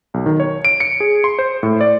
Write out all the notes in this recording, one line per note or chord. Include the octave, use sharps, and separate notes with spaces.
B1
D#3
C#5
D7
C#7
G#4
C6
C5
A2
D5